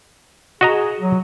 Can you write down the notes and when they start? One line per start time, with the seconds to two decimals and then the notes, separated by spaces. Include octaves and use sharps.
0.61 F#4 G#4 D#5 A#5
1.00 F#3